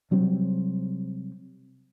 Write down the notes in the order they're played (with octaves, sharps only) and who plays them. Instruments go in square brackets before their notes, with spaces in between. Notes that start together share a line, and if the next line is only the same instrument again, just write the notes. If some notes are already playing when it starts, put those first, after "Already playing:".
[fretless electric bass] C3 F#3 G3 C4